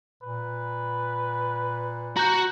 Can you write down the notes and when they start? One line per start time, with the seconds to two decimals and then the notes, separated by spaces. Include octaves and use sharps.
0.23 A#2 B4
2.17 F#4 F#5 A#5 G6